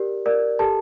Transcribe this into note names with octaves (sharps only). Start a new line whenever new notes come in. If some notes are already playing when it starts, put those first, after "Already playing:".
Already playing: G4 A#4 D5
A#4 D5
G4 A4 A5